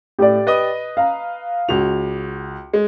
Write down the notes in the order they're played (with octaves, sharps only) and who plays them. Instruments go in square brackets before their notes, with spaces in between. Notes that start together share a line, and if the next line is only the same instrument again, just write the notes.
[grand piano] A2 [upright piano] G4 D5
[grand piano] B4 D#5 D#6
[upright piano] F5 A#5
[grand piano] C#2 F7 [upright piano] F#4
[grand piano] G#3